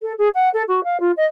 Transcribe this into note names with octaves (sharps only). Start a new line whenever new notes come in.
A4
G#4
F#5
A4
F#4
F5
F4
D#5